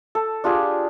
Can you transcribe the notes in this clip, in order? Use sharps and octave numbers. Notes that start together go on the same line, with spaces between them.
A4
D4 F4 G4 G#4